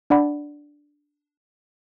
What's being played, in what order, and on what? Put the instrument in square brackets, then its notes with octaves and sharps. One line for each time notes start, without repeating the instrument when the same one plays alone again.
[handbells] D4 D5 F#5 B5